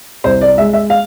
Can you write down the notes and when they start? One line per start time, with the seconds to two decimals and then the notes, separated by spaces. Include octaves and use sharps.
0.24 C2 C5
0.41 D5
0.58 G#3 E5
0.73 E5
0.90 F5